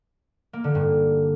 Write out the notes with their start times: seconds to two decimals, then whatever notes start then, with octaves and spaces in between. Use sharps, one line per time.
0.53 A#3
0.64 D3
0.75 G2